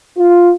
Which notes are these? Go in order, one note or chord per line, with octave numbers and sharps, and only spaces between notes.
F4